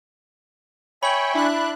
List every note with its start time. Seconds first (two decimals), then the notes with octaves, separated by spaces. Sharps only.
1.03 C#5 E5 G5 G#5 B5 C#6 F#7
1.34 D4 E4 F#6